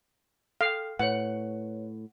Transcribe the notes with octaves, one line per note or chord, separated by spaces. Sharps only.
A4 F5 G5
A2 B4 C#5 F#5